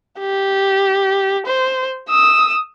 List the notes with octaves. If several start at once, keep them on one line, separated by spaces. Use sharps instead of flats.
G4
C5
D#6 E6